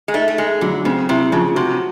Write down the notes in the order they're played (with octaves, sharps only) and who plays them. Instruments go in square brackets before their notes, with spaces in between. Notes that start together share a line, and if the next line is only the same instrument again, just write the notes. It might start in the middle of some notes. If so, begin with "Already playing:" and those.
[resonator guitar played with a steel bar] G#3
[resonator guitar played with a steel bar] A3 [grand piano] D#4
[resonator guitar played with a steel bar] A3
[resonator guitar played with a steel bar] G#3 [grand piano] G#4
[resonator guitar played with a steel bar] D3 [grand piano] F#3
[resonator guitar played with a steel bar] C#3 [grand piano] C4
[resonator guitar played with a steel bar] C3 [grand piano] E4
[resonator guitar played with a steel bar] C#3 [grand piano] F3
[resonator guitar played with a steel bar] C3 [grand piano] F#4